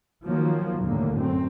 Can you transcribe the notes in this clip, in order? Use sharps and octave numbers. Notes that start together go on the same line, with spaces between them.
D#3 F3 F#3 A#3
D#2 A2 D3 A#3
F#2 C4